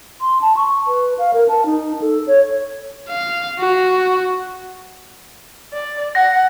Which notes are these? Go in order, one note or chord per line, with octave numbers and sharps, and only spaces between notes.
C6
A5
C#6
B4
F5
A#4
A5
D#4
A4
C#5
F5
F#4
D5
F#5 A#6